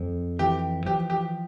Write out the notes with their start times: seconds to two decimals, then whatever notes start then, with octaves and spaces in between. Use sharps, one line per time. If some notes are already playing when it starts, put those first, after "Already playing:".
Already playing: F2
0.39 E3 G4
0.86 F3 G4
1.10 G4